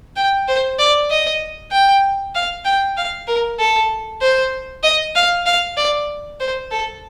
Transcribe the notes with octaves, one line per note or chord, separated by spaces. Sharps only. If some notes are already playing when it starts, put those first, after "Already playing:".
G5
C5
D5
D#5
G5
F5
G5
F5
A#4
A4
C5
D#5
F5
F5
D5
C5
A4